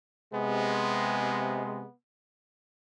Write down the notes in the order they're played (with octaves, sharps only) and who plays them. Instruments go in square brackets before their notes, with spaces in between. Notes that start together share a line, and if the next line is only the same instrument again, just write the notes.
[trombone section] C3 G#3 [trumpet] B3